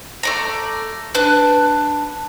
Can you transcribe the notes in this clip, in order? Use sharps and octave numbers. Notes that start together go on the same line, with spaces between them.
A3 D5 A#5
D4 B4 F#6